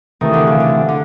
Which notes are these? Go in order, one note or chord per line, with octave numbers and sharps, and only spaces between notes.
C3 D#3 E3 A3
D3
C#3
D3
D3